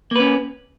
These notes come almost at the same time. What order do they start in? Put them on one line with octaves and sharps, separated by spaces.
A#3 B4 C#4